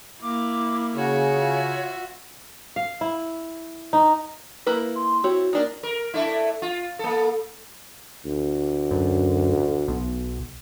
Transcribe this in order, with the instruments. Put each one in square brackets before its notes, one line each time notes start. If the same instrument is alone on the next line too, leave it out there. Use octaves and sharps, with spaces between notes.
[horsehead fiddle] A#3 E4 [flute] D6
[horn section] C#3 [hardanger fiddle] F#4 [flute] C#5
[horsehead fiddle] F4 E5
[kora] F5
E4
D#4
[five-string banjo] A#3 E4 B4
[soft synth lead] C6
[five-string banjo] C4 E4 C#5 [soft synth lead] F#4
[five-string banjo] A#3 D4 D#4
[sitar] A#4
A3 D4 E4
F4
A#3 A4
[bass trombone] D2
[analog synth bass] F#2
B1